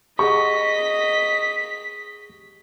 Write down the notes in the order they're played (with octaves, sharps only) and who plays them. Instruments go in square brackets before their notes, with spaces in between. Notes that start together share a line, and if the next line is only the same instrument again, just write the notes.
[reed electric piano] G4 G#4 F#5 [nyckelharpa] D#5 [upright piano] C#6 [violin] B6